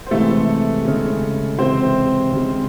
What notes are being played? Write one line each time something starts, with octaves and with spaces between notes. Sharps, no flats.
C5
C3 E3 G#3 A3 A4
C#3 G#3
C3 E3 G#3 C4 C5
C#3 G#3